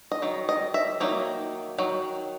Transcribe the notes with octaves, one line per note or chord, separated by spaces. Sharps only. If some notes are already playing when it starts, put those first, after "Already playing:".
D#5
D#3 F#3
D#5
E5
D#3 F#3 A#3 D#4
D#3 F#3